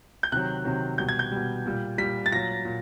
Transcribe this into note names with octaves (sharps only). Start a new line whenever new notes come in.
G6
C3 D#3 F#3 F#6
C3 D#3 F#3
B2 G3 G6
G#6
G6
B2 G3
A#2 G3
A#2 G3 B6
A6
A#2 F#3 A#6
A#2